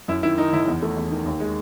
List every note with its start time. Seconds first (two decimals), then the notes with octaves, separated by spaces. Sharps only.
0.08 F#2 E4
0.23 D#3 E4
0.38 D#3 D#4
0.53 F#1 E4
0.67 E2
0.83 A3
0.97 E2
1.11 D#3
1.26 D#2
1.40 G#3